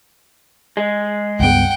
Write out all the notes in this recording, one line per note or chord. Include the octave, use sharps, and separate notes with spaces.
G#3
C#2 G2 B3 F#5 G5